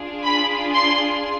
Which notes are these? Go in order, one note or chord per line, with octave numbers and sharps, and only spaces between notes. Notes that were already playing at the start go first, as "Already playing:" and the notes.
Already playing: D4 F4 G#4
B5
C6